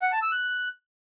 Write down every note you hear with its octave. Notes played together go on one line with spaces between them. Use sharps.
F#5
A5
E6
F#6